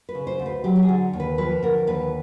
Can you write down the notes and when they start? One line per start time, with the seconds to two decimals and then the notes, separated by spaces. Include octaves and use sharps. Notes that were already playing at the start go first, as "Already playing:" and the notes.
0.09 B4
0.15 C#3
0.27 C5
0.39 D2
0.46 B4
0.64 F#3 G4
0.76 G4
0.83 G#4
0.89 D3
1.13 D#2
1.20 B4
1.38 F3 B4
1.63 D3 A#4
1.87 D#2 B4